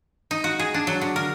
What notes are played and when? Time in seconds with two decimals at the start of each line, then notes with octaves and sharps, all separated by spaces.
0.31 D#4
0.44 F#4
0.59 G#4
0.74 D4
0.87 F#3
1.01 D3
1.16 A#4